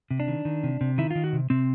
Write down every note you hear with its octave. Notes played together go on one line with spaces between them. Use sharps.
C3
D4
D#3
D#3
C3
C3
D#3 E4
D#3 F4
F#4
C3
C3 C4